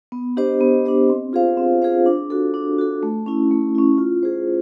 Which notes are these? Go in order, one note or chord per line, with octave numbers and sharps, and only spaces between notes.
B3
D4 G4 C5 D#5
B3
D4 G4 C5 D#5
C4
F4 G#4 C5 F5
C4
F4 G#4 C5 F5
D4
F#4 A4
D4
F#4 A4
A3
C#4 E4
A3
C#4 E4
F4
G#4 C5